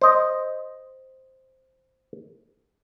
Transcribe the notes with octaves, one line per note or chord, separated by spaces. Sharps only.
C5 D#5